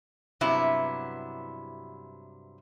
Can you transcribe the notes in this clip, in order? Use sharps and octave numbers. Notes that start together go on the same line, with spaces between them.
G2 C3 F#3 B3 E4